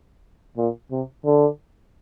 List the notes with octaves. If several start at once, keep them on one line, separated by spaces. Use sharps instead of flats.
A#2
C3
D3